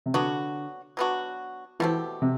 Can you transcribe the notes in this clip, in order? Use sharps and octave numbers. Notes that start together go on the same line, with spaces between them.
C3
D3 F#3 B3 D4 F#4
F#3 B3 D4 F#4
B2 E3 A3 C4 G4
C3